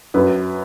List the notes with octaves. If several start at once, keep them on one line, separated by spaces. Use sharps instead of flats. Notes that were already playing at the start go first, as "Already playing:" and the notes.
F#2 B4